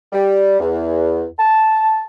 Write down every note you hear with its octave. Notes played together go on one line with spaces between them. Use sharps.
G3
E2
A5